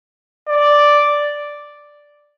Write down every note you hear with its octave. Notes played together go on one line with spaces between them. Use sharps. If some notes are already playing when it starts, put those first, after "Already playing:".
D5